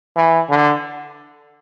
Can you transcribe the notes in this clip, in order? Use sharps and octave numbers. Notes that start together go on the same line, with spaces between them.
E3
D3